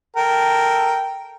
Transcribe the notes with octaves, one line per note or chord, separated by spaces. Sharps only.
A4 A#4 G5